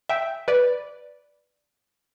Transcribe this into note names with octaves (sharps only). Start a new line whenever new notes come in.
E5 G5
B4 D5